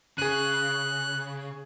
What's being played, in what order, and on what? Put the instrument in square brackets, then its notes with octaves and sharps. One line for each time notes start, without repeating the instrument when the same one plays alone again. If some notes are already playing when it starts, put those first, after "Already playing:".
[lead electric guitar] C#3 [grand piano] G#4 D#7 [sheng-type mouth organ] F#6